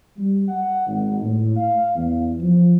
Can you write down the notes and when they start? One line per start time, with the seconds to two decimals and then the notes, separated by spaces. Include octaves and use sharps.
0.17 G3
0.48 F#5
0.87 G#1
1.21 A2
1.56 F5
1.96 E2
2.39 F3